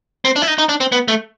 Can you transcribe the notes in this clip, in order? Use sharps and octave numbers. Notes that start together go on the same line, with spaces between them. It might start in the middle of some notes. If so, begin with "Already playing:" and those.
C4
D4
E4
D#4
D#4
D4
C4
B3
A3